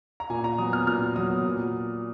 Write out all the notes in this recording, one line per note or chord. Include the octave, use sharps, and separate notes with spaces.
A#5
A#2 G#5
A#5
F#3 B3 D#6
F6
A#2 F6
F#3 B3 D#6
A#2